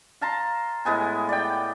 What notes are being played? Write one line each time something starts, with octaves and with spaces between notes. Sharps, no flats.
F5 A5 A#5 C6
A2 G#3 B3 G#5
D5 G5